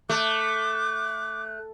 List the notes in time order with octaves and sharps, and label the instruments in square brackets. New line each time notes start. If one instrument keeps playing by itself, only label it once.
[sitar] A3 [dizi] D6 [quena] F#6